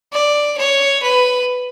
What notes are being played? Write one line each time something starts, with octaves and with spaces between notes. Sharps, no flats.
D5
C#5
B4